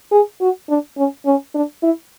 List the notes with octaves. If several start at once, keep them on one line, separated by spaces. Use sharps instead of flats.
G#4
F#4
D4
C#4
C#4
D4
E4